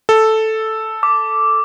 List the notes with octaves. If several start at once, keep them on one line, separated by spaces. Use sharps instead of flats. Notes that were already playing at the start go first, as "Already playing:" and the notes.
A4
D6